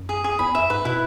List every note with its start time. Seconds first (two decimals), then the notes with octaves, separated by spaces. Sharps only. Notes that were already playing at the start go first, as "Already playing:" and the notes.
Already playing: F#2
0.09 G#4
0.24 G#4
0.39 E2 B5
0.54 F#2 E5
0.70 G#2 B4
0.85 B2 E4